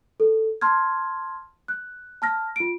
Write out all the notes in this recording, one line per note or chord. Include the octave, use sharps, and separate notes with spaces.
A4
A5 C6 F6 G#6
F#6
A5 F6 A#6
F4 D7